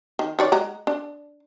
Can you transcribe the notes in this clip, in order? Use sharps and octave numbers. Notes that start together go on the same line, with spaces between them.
D#3
D#3 C#5 D5
G#3 F#5 A#5
D4